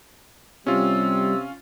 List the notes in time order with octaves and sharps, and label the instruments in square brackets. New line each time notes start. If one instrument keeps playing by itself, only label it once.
[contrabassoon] C3 [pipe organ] G3 [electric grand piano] C#4 F4 [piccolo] E6